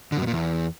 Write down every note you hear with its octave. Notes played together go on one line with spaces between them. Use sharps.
D3
F#2
B2
A#2
E2